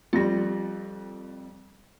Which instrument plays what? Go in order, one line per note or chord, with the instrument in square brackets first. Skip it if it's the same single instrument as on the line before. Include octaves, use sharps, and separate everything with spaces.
[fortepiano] F2 G3 [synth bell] F4 A#6